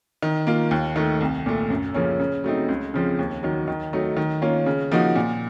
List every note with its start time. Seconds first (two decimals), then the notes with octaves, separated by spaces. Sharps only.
0.22 D#3
0.47 A#3 F4
0.71 D#2
0.96 D#3 A3
1.21 C2
1.46 A#2 A3
1.70 F#2
1.94 C#3 F3 A#3 C#4
2.20 C#3
2.44 F#3 A3 C4 D#4
2.69 C#2
2.94 C#3 F3 C4
3.19 D#2
3.43 D#3 F#3
3.68 D#3
3.93 F#3 A3 D#4
4.17 D#3
4.42 A#3 C#4 F4
4.66 C#3
4.91 F3 A#3 D#4 F#4
5.16 A#2